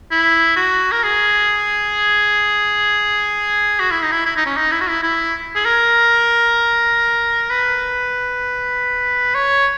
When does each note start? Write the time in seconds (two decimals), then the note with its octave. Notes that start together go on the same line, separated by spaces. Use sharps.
0.11 E4
0.56 F#4
0.92 A#4
1.04 G#4
3.80 F#4
3.91 E4
4.02 D#4
4.12 E4
4.26 E4
4.37 D#4
4.46 C#4
4.56 D#4
4.72 E4
4.81 F#4
4.89 E4
5.03 E4
5.55 G#4
5.65 A#4
7.50 B4
9.35 C#5